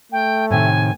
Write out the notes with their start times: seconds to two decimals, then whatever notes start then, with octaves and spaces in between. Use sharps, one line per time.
0.12 A3 G5
0.50 A2 C3 D#3 G#5